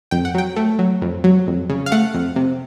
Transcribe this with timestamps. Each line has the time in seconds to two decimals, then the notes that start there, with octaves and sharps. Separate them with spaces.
0.11 F2 G5
0.25 F#5
0.34 F#3 G5
0.56 A3
0.79 F#3
1.02 F2
1.24 F#3
1.47 F2
1.70 C#3
1.86 F5
1.92 A3 F#5
2.14 F2
2.36 C3